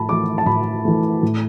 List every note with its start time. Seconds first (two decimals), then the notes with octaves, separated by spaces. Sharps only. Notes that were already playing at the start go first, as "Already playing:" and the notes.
Already playing: A2 A5 B5
0.09 E3 A3 D6
0.38 A5
0.46 A2 B5
0.85 E3 A3
1.23 A2